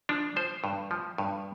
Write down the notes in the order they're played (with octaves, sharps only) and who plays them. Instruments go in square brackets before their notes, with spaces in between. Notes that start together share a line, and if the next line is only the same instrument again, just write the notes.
[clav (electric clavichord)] F3 D4
F3 C5
G2
F3
G2